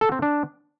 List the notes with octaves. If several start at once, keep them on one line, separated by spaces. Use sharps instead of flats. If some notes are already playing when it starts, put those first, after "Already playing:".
A4
C4
D4